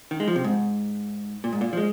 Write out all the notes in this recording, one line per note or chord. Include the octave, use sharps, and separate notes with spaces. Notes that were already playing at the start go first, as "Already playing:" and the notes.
D#3
G#3
F3
C3
G#2
A#2
G#2
A#2
F3
G#3